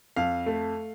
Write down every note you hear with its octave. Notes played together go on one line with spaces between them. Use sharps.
F2 F5
A3